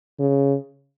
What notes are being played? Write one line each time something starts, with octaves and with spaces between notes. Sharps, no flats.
C#3